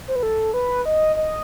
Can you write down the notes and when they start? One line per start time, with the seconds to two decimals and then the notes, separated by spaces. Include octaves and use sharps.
0.08 C5
0.16 B4
0.23 A4
0.54 B4
0.85 D#5
1.16 D#5